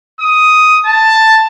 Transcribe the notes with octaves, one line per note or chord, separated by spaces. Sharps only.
D#6
A5